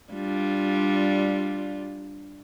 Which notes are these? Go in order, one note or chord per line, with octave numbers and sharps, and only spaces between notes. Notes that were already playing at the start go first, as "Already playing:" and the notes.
G3 D4 F4